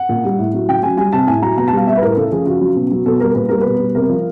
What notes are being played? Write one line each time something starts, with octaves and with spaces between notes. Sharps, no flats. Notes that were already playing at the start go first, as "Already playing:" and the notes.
Already playing: F#5
A#2
G3
A2
F#3
C#3 G5
F#3 G#5
G3 G#5
C3 A5
A2 G#5
F#3 A#5
B2 A#5
A5
G3 F5
G3 E5
B4
A2 A#4
C#3 A4
F3 G#4
C#3 F#4
F#3
B2
F#3
B2 A4
G3 A#4
A#2 B4
G3 A#4
B2 B4
G3
C3 A#4
F3